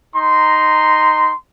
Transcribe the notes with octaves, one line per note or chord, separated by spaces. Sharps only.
D#4 A#5 C6